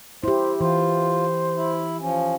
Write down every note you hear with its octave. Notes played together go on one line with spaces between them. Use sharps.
E4 G4 C5
E3 F4 C5
E4
F3 C#4